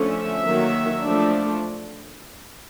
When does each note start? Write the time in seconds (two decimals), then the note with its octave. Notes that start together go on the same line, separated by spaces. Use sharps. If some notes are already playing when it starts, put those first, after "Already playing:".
Already playing: D3 F3 A3 C#4
0.12 E5
0.42 D#3 F#3 A#3
1.02 F3 A3 D4